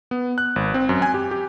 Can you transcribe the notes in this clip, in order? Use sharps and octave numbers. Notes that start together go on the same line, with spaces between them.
B3
F#6
G#1
C4
F#2
G#5
G4
G4